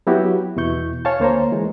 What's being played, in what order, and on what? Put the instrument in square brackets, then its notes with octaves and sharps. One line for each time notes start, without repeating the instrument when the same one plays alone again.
[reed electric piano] F#3 B3 E4 F#4 G4
E2 B2 E4 C#6 G6
C#5 F5 G#5 A5
D2 A#3 C5 C#5 A#5
E3 G#3